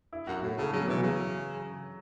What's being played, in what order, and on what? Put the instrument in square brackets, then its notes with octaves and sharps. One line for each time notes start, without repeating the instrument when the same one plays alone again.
[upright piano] E4
[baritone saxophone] F#2 [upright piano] F#4
[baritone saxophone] A2 [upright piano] F#4
[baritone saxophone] C#3 [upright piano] A4
[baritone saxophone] C#3 [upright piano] F#3
[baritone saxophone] B2 [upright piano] E3
[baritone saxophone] C#3 [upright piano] F#3